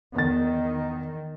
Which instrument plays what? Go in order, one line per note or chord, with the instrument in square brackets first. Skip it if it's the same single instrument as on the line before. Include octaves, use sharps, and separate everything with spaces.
[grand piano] E2 A6 [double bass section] D#3